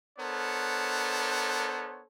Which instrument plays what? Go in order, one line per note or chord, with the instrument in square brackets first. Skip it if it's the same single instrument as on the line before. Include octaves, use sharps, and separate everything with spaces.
[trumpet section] B3 D4 A4 A#4 C5 C#5